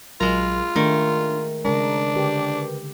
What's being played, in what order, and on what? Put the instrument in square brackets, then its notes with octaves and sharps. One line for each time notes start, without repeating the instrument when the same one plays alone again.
[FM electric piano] A#1 F#3 A#4 [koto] G#3 A#5 [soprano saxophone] F4
[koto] D#3 [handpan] A3 [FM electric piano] D4
[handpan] C#3 G#3 [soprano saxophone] D4 [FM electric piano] A#4 A#5
[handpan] D3 G4 [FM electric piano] A#4 B4